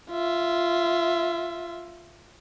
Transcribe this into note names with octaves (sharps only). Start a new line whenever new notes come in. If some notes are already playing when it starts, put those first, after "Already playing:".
F4 E5